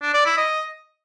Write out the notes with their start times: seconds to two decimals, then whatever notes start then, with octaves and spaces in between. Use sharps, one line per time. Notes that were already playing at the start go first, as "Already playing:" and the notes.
0.02 D4
0.14 D5
0.26 E4
0.37 D#5